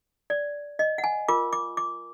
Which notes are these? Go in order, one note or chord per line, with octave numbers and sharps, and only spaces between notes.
D5
D#5
F#5
G#5
F4 A#4 D6
D6
D6